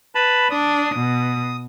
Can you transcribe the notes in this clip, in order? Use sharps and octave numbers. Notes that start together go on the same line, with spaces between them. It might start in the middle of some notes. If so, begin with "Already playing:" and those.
B4 A5 B5
D4 D#6
B2